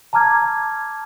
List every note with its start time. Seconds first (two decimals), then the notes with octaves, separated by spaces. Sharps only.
0.13 A5 A#5 D6 F6 G#6